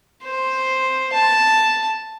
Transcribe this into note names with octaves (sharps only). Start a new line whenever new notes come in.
C5
A5